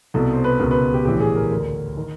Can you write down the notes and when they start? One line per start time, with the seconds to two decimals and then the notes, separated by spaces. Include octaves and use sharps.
0.14 C2 B2 A4
0.33 C5
0.44 B4
0.60 C#2 B2 A#4
0.71 B4
0.94 G4
1.05 A#1 A2 E3 G4
1.20 G#4
1.36 A#4
1.51 D2 D3 A#4
1.97 D#3